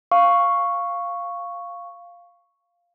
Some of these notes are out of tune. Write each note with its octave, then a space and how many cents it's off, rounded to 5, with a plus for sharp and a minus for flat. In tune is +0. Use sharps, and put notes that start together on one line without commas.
F5 +0 C#6 +0